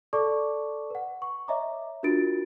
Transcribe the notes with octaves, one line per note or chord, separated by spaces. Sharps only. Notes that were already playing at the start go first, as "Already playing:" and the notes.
A4 D5 A5 C#6 D6
B4 F#5
C#6
C#5 D#5 E5 G#5 A#5 D6
D4 F4 F#4 A#4 A6 D7